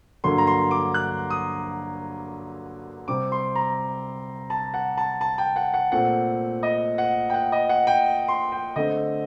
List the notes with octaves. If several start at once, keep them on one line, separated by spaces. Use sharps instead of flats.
G2 D3 F#3 A#3 C6
A#5
C6
D6
F#6
D#6
C3 G3 C4 D6
C6
A#5
A5
F#5
A5
A5
G5
F#5
F#5
A#2 A3 C4 F#5
D#5
F#5
G5
F#5
D#5
F#5
G5
C6
G5
D3 A3 C4 D#5